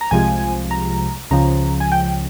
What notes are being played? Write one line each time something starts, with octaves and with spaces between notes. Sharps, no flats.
A#5
C2 C3 F3 G#3 G#5
A#5
C#2 C#3 F3 A#5
G#5
G5